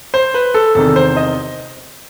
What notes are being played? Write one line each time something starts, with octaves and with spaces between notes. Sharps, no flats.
C5
B4
A4
E2 C3 D#3 A4
C5
D#5